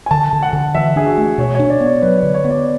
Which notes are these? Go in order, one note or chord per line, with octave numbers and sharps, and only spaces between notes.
G#5
D3 A5
D3
F#5
D3
E3 E5
D4 G#4
F#4
A3
B2 C#5
D4 C#5
D5
B3
C#5
F#3 B4
C#5
D3
C#5
B3
D5